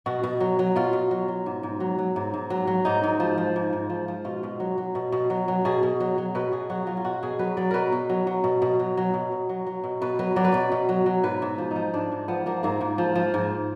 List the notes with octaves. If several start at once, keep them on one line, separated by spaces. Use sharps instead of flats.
B2 F#4
B2
F#3
F#3
B2 F4
B2
F#3
F#3
G#2
G#2
F#3
F#3
G#2
G#2
F#3
F#3
G#2 D#4
G#2
F3
F3
G#2
G#2
F3
F3
B2 F4
B2
F#3
F#3
B2
B2
F#3
F#3
B2 G#4
B2
F#3
F#3
B2 B4
B2 G#4
F#3 F#4
F#3 F4
F4
B2 F#4
B2 G#4
F#3 B4
F#3 D5
B2 A#4 B4
B2
F#3
F#3
B2
B2
F#3
F#3
B2
B2
F#3
F#3
B2
B2 B4
F#3 B4
F#3 D5
B4
B2 D5
B2
F#3
F#3
G#2 B4
G#2
F3
F3 D#4
G#2 D4
G#2
F3 B3
F3 A#3
G#2 A#3
G#2
F3
F3
G#2